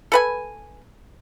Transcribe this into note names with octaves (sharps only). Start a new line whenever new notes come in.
A4 B4 G#5